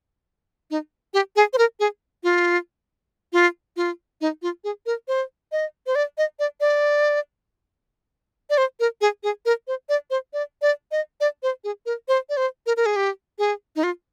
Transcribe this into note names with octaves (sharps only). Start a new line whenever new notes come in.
D#4
G4
G#4
C5
A#4
G#4
F4
F4
F4
D#4
F4
G#4
A#4
C5
D#5
C5
D5
D#5
D5
D5
D5
C5
A#4
G#4
G#4
A#4
C5
D5
C5
D5
D5
D#5
D5
C5
G#4
A#4
C5
D5
C5
A#4
A#4
G#4
G4
G#4
D#4
F4